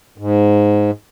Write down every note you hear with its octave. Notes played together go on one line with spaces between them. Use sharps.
G#2